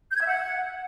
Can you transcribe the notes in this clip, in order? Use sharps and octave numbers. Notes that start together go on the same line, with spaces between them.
G6
G#6
E5
F#5